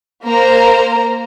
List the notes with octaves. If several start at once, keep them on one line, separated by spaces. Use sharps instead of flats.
A#3 A#4 C5 A#5